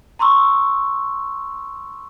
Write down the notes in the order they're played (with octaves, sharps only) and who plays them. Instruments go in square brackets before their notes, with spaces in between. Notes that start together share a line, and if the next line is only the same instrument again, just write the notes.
[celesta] A#5 C6 C#6 E6